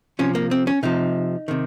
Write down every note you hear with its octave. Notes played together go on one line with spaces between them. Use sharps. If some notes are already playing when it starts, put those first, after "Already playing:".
C3 F3 C#4
A#3
C4
C#4
C3 F3 D#4
C3 D#3